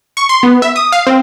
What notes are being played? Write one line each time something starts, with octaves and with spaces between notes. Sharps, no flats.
C#6
C6
B3
E5
D#6
F5
C4